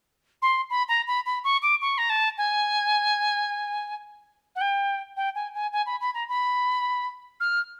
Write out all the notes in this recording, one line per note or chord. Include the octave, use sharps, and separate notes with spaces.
C6
B5
A#5
B5
B5
C#6
D6
C#6
A#5
A5
G#5
F#5
G5
G5
G#5
G#5
G#5
B5
B5
A#5
B5
F6